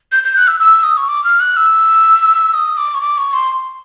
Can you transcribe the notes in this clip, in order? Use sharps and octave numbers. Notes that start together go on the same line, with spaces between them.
G6
G6
F#6
E6
E6
D#6
C#6
D6
F6
F#6
E6
D#6
D6
C#6
D6
C#6
C6